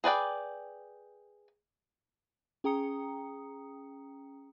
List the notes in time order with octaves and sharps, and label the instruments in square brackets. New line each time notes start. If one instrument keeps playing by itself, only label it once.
[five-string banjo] G#4 B4 D5 G5
[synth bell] C#4 G#4 G5 A#5 D#6 C#7